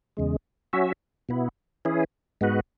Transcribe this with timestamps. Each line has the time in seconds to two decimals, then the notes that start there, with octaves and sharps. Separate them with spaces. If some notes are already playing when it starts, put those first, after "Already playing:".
0.17 E2 C#3 G#3
0.73 F#3 C#4 F#4 E5
1.29 B2 B3 E4
1.85 E3 C#4 E4 G#4
2.41 G#2 G#3 B3 F#4 B4